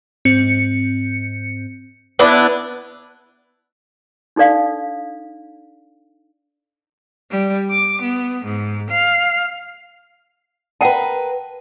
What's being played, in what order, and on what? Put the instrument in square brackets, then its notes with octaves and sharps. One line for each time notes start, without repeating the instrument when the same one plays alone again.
[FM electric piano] G#2 C4 C#7
[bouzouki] B3 D4 E4
[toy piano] D4 D#4 A4 D5 F5
[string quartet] G3
D6
B3
G#2
F5
[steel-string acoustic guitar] A#4 B4 [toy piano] F#5 G5 A5